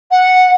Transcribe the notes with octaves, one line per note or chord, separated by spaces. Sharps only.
F#5